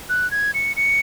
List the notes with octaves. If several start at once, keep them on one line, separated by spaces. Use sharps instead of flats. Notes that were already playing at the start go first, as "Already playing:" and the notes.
F#6
G#6
C#7
C#7